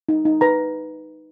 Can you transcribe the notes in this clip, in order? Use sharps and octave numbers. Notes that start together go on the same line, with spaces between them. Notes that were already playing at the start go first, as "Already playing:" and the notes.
D#4
D#4
B4 A#5